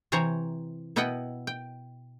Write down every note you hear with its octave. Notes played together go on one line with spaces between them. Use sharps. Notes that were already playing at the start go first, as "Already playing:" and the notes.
C3 E3 C5 C#5 A#5
B2 B3 E4 D#5 F#5 G5
G5